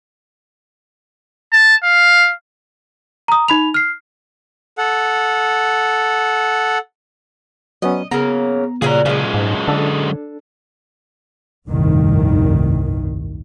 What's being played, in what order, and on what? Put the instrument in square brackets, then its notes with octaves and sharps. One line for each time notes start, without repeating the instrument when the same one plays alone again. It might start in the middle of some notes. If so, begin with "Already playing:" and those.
[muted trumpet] A5
F5
[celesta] A#5 D#6
D#4 B5 F7
F6 C7
[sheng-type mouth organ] A4 F#5
[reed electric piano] F#3 B3 C#4 [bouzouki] D#5
[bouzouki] C#3 F#3 A#3 [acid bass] B3 [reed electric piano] A#5
[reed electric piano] A#2 [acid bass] C#3 [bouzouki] F#3 G3 F#4 [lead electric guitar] G#4 A#5
[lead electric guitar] F#2 G#3 [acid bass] C#3 [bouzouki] F3 A3
[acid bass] G#2
[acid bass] D3 [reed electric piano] D4 A4
[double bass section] F1 C2 G2 A#2 D#3